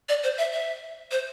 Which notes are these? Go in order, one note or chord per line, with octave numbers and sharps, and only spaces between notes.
D5
C5
E5
E5
C5